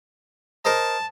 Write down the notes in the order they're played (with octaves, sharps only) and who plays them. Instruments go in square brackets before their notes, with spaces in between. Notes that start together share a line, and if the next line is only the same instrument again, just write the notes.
[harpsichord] A#4 C5 D#5 [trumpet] A5